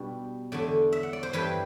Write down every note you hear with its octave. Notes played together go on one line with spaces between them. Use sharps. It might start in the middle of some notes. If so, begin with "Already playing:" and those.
Already playing: B2 G3 B3 D4
E2 D3 A3 D4
E5
F#5
D5
C5
G2 E3 G3 D4 B4